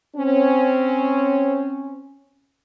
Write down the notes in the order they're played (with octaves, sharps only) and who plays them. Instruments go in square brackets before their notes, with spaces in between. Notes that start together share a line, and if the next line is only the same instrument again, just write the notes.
[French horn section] C4 C#4